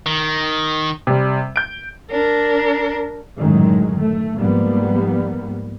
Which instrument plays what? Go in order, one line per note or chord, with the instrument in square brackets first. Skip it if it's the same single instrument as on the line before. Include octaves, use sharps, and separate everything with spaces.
[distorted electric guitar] D#3
[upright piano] C3 G3
G6 D7
[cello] D4 A#4
[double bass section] F#2 A2 D3 D#3 F#3 G#3
A3
G#2 F3 G3 A#3 B3